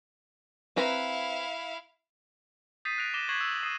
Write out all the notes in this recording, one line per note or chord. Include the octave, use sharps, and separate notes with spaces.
C4 E4 B4 F5 A#5
D#6 G6 A6 B6 C7 D#7
F#6 A#6 D7 F7
D6 F#6 A#6 B6 E7 G7
C#6 F#6 G#6 B6 C7 F#7
E6
D#6 C7 D#7 E7